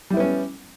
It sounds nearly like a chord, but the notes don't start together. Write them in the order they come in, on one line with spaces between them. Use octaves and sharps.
G3 E4 B3 C#4